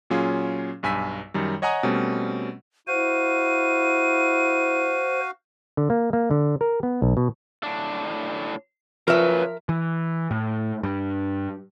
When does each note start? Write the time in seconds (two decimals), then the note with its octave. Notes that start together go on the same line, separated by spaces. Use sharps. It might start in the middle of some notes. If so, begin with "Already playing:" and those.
0.10 A#2 F#3 C#4 F4 G#4
0.83 B1 G2 G#5 E6 B6
1.34 F#2 D#3 G3
1.62 C#5 D#5 F#5 G#5 A#5 D#6
1.83 B2 G3 A3 C4 C#4
2.87 E4 F#4 C5 F5 D#7
5.77 D3
5.90 A#3
6.13 A#3
6.31 D3
6.61 A#4
6.83 B3
7.02 B1
7.17 B2
7.63 A2 D4
9.08 C#3 F3 F#3 A#4 B4 E5
9.69 E3
10.31 A2
10.83 G2